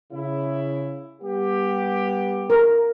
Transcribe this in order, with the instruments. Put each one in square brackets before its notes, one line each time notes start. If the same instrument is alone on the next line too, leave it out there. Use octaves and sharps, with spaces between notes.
[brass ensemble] C#3 E4
G3 B3 G4
[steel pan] A#4